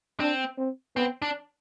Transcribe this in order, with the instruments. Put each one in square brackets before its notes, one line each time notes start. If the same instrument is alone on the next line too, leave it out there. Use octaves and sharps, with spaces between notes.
[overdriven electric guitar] C4 [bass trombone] D4
[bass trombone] C4
[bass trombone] B3 [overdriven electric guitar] C4
[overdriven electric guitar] D4